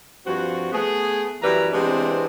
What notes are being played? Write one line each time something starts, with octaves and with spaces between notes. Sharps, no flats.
G2 F3 C4 F#4
A3 B3 G#4
F#2 E3 G3 B4 E5 A#5
C3 E3 G#3 B3 C4 D4